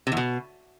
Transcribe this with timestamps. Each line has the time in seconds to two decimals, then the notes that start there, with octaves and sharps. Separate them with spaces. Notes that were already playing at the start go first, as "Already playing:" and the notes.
0.07 C3
0.12 E2
0.17 B2